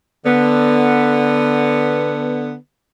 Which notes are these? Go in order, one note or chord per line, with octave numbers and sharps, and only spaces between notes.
D3 B3